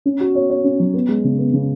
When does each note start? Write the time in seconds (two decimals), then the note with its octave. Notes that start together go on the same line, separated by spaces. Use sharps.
0.06 C#4
0.21 F#4
0.35 C#5
0.50 C#5
0.64 C#4
0.80 F#3
0.94 B3
1.09 G#3
1.24 C#3
1.38 B3
1.53 C#3